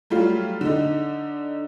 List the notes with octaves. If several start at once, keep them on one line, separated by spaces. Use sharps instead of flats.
F#3 G3 A3 F4
D3 D#4